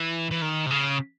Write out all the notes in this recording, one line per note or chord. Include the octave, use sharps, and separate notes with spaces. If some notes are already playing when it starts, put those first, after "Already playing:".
Already playing: E3
E3
D#3
C3
C#3